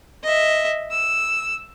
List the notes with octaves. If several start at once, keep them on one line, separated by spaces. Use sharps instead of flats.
D#5 E5
E6